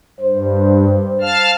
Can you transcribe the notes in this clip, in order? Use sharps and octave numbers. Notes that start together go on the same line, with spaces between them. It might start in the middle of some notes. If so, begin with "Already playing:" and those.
G2 C5
F5 A5 F6